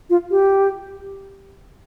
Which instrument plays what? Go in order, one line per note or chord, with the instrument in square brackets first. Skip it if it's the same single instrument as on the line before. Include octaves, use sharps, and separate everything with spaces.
[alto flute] F4
G4